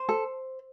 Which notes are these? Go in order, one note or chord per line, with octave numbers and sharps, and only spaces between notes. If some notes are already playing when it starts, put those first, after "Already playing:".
Already playing: C5
A4